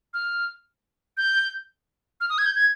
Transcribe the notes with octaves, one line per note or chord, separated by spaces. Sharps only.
F6
G6
F6
D#6
G#6
G6
G#6